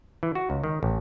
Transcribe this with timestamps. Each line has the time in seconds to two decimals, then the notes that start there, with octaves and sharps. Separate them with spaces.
0.23 E3
0.35 F#4
0.50 C#2
0.64 D#3
0.83 A1